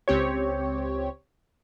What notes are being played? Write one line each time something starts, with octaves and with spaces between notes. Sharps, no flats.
C#2 C4 G4 C#5